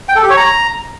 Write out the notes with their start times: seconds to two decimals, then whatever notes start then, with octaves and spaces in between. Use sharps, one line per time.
0.09 G5
0.16 A4
0.23 G4
0.30 C#5
0.37 A#5